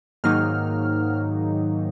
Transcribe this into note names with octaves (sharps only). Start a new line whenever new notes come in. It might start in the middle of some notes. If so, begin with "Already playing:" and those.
G#2 D#3 F#3 A#3 D#4 F6